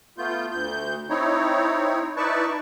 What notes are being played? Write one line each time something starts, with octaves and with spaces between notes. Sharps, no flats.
A3 B3 F4 G6
D2 G6
C4 D#4 E4 C#5
D#4 E4 B4 D5 A5 C#6